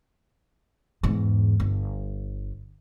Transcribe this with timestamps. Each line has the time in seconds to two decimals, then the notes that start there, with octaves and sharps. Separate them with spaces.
1.03 E2 G#2
1.60 G1